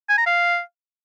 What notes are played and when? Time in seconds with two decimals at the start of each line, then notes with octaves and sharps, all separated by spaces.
0.10 G#5
0.18 A#5
0.27 F5